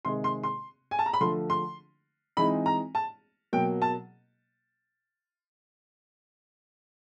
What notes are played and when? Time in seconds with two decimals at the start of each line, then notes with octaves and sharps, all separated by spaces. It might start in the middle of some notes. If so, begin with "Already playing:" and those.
0.05 C3 D#3 G#3 C6
0.24 C6
0.43 C6
0.91 G#5
0.99 A5
1.06 A#5
1.13 B5
1.21 D3 F3 A3 C6
1.50 C6
2.37 E3 G#3 C4 D#4 B5
2.66 A#5
2.95 A5
3.53 B2 F#3 A#3 G5
3.82 A5